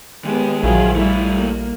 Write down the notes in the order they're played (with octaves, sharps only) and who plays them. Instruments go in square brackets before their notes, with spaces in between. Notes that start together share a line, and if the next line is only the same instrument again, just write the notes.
[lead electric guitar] D#2 G4 [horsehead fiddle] G#3 B3
[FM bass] A#1 [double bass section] D#3 F3 F#3 [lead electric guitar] E4 F4 [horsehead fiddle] G#4
[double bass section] G3 [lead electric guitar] A3 F4 [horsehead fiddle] E4
[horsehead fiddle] A#3